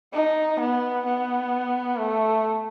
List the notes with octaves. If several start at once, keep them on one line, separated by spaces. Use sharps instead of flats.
D#4
B3
B3
A3